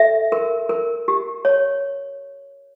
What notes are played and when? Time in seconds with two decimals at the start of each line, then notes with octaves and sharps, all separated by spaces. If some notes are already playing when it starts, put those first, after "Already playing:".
Already playing: A4 E5
0.32 A#4
0.69 A#4
1.08 G4
1.45 C#5